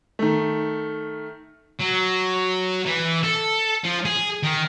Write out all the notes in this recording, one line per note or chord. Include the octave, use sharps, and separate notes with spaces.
D#3 A3
F#3
E3
A4
F3
G#4
D#3